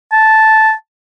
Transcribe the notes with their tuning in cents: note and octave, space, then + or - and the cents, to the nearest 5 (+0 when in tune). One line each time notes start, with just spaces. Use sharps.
A5 -5